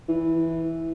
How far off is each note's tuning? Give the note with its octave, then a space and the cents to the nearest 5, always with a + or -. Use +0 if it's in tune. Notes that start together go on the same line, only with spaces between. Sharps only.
E3 -5